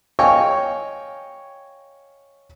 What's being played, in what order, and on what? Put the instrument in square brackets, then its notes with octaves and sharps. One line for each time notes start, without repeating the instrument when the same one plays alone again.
[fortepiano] C#5 D#5 F5 G5 G#5 C#6